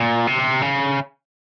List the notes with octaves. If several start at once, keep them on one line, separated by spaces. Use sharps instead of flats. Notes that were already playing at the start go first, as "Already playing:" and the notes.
Already playing: A#2
C3
C#3